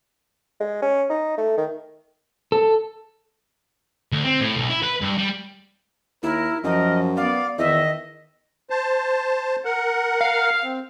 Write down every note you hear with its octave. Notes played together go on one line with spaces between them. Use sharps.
G#3
C#4
D#4
A3
D#3
A4
D2
C4
A2
B1
E4
B4
G2
G3
D#2 E4 A#4
F#2 F3 A#4 D#5
B3 D5 F5
E2 D#3 D#5 E5
C5 A5
A#4 F#5
F5
C4